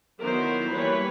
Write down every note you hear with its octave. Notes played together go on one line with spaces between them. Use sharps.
D#3 F#3 B3 E4 A#4 C5
E3 G3 A#3 B4 C#5